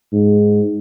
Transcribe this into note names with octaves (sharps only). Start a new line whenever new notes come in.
G#2